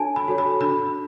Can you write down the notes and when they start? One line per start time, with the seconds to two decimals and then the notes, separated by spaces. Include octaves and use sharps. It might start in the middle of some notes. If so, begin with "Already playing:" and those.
Already playing: D4 F#4 A4 C#5 G#5 A5
0.16 B5
0.28 F#4 A4 C#5
0.38 B5
0.61 D4 B5